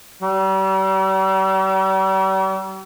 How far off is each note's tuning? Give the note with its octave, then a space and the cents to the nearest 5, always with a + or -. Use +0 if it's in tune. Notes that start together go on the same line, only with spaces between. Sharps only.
G3 -40